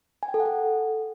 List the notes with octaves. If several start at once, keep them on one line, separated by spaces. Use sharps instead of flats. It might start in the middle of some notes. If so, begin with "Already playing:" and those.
G#5
G5
A4
F#5
A4